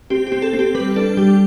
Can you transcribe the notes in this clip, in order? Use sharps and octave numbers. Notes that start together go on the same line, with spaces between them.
C4 G4
G4
C4
A4
C4
G4
G3 B4
D4 A4
G3 G4